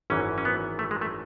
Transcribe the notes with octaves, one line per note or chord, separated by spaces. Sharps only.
G#1 F#2 E3 C#4
C#4
B3
A3
G#3
A3